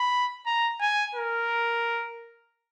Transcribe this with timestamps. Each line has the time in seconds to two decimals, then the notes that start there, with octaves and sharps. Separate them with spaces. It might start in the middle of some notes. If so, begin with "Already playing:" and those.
Already playing: B5
0.47 A#5
0.81 G#5
1.15 A#4